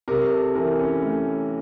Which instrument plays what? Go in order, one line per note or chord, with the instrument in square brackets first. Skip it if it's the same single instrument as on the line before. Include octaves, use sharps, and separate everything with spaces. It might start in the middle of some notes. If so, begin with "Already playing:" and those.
[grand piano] C3 A#4
A4
E3 A#4
C#4 C#5
A3